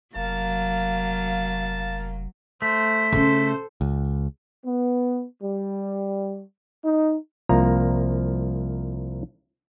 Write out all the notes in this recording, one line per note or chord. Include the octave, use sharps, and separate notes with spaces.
F1 F#3 A#3 F5 A5
A3 C5 B6
C#3 C#4 A4 C5
C#2
B3
G3
D#4
C2 F3 A#3 A#5